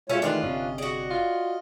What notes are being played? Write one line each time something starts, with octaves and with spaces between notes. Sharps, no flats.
B2 G#3 A3 C#4 F4 A4 C#5
D#3 E3 G#3 A3 D4 F4 B4 D#5
G1 C3 C#4
F#4 G#4 D5
F4